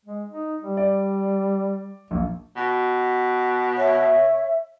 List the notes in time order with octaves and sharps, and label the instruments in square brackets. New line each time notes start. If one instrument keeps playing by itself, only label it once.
[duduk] G#3
D#4
G3
[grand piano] D5
[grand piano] A#1 [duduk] A#3
[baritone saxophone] B2
[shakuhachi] C#5 [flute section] E5